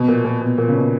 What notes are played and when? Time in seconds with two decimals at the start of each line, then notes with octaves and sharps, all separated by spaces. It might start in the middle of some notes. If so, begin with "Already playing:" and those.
Already playing: B2
0.08 A#2
0.25 A#2
0.41 B2
0.58 A#2
0.69 C#3
0.74 B2